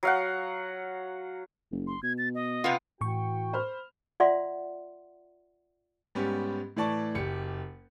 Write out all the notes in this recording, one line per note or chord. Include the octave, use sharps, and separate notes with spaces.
F#3 F5 F#5
F#1
C6
B2 G#6
A6
D#5
C3 B3 F4
A2 E3 F#4 G5 C#6
C5 B5 F6
F4 D5 E5 F#5 C6
G#2 G3 B3 C#4 G4
A2 E3 D5 A5 C#6
F#1 G4 C#7